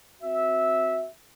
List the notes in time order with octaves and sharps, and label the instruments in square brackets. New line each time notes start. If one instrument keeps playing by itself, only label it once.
[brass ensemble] C4 F#4 E5